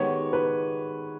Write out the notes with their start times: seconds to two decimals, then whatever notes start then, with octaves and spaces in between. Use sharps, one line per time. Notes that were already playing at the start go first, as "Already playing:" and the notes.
Already playing: D#3 G#3 B3 G4 C#5
0.33 B4